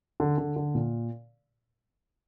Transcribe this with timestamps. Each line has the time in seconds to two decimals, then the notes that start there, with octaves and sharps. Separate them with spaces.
0.20 D3
0.38 D3
0.56 D3
0.75 A#2